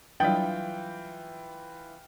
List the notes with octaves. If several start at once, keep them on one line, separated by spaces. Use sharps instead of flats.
E3 F#3 G3 D4 F4 G5